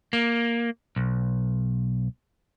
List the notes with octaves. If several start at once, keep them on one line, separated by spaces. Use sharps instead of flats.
A#3
B1